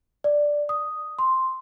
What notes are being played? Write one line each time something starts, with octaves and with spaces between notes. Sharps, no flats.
D5
D#6
C6